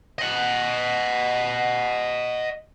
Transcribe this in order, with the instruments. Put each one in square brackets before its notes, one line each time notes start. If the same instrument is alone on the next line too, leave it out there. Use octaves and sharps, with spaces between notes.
[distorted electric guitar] D#5 F#5